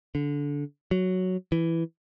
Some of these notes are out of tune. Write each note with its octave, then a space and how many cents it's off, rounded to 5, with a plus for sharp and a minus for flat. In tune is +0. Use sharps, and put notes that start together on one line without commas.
D3 -20
F#3 +0
E3 +5